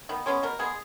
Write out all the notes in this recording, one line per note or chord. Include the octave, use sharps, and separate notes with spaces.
D#3 B3
G#3 B3 C#4
B2 A#4
G#3 B3 G#4